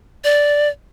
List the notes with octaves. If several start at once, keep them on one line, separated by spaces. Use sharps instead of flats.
D5